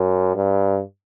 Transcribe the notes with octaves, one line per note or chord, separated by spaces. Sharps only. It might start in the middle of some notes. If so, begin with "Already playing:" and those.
Already playing: F#2
G2